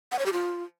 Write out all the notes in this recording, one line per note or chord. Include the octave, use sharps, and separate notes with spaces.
F#5
C#5
G4
F4